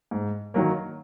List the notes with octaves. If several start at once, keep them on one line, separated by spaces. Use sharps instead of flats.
G#2
D#3 F#3 A#3